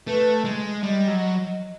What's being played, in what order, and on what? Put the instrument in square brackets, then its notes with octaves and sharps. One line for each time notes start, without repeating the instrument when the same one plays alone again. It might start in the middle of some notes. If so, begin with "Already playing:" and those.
[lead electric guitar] A3 [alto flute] B4
[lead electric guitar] G#3
[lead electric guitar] G3 [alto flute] D#5
[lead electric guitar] F#3